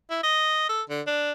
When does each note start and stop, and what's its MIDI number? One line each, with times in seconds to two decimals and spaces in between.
0.10 0.20 64
0.23 0.65 75
0.69 0.82 69
0.89 1.01 50
1.07 1.32 62